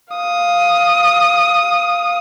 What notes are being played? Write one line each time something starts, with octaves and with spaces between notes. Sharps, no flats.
F5 D#6